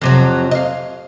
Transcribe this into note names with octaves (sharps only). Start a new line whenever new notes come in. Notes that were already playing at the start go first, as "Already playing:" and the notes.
F2 C3 F#3
D#5 F5